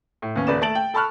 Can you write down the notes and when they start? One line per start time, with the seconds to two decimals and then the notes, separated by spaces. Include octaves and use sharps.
0.22 A2
0.35 D#2 B3 C#4
0.47 D#1 B4 D5 E7
0.61 A3 A5 A6 D7 F#7
0.75 G5
0.94 A4 A5 B5 C#6 F6 F#6